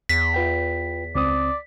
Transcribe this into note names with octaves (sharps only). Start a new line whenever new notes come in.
E2 B6
F4 B4 G5
C#2 C4 D5 D#6